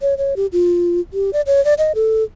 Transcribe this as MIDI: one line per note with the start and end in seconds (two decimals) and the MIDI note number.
0.01 0.14 73
0.18 0.34 73
0.36 0.46 67
0.52 1.00 65
1.13 1.31 67
1.33 1.41 74
1.47 1.63 73
1.65 1.74 74
1.78 1.92 75
1.95 2.23 69